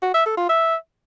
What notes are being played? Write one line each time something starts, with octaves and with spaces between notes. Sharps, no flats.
F#4
E5
A4
F4
E5